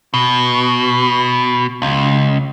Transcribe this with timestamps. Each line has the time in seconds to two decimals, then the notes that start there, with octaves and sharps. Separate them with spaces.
0.14 B2
1.82 C#2